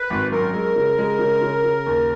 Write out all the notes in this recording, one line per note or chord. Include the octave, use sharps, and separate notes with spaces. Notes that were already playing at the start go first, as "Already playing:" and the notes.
Already playing: B4
G#1
F#2 A#4
G#3
C#3
G#3
C#3
C#3
C#3
D#2